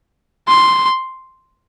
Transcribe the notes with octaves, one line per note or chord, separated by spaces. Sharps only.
C6